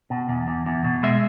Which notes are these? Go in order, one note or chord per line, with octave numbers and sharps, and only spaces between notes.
B2
E2
E2
E2
B2
G#3 E5